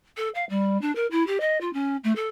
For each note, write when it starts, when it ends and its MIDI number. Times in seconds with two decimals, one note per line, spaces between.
0.17 0.29 69
0.35 0.45 77
0.49 0.80 55
0.81 0.94 62
0.95 1.07 70
1.11 1.25 64
1.27 1.38 67
1.40 1.60 75
1.61 1.73 65
1.73 1.97 61
2.04 2.13 57
2.16 2.28 69